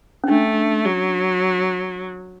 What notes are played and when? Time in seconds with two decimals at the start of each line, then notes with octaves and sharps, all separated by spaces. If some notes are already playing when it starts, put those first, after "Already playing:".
0.24 C#4
0.28 A3 D4
0.85 F#3